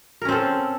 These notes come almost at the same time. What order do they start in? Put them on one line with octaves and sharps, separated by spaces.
A#4 C#4 C4 A4